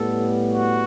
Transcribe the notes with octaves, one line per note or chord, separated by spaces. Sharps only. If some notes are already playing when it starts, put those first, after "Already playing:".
Already playing: A2 G3 B3 A4
F#4